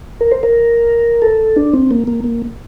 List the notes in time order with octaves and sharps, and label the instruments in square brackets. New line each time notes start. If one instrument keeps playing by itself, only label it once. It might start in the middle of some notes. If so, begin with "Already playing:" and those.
[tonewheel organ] A#4
C5
A#4
A4
D4
C4
A#3
A#3
A#3